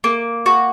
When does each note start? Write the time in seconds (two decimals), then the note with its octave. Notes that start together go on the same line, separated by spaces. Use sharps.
0.04 A#3
0.46 F#4